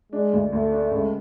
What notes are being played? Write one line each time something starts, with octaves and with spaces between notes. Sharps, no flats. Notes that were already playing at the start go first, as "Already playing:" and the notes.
G#3 D4
D2
D2 A3
D4
C#2